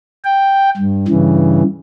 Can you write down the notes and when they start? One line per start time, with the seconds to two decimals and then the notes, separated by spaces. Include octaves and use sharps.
0.25 G5
0.77 G2
1.08 G2 C#3 E3